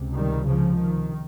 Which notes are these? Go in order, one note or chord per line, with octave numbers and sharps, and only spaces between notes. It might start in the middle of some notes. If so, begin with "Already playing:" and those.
Already playing: C#2 C3
D#3 G3
C#3 F3
D#3